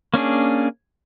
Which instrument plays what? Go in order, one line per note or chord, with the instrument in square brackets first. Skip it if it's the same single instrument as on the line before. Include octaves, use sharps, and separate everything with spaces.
[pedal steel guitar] A#3 C#4 D4 G#4